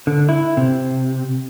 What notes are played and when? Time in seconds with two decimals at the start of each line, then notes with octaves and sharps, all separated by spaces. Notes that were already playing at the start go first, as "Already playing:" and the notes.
0.07 D3
0.29 E4
0.57 C3